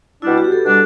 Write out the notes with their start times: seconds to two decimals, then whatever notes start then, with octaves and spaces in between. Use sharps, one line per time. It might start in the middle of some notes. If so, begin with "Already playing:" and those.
0.22 B2 G3 D4 E4
0.38 F#4
0.44 G4
0.52 A4
0.66 B2 G3 D4 A4